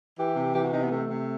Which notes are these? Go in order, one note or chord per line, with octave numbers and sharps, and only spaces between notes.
E3 G4
C3
E3 G4
F#4
C3 D#4
B3
C3 A3
C3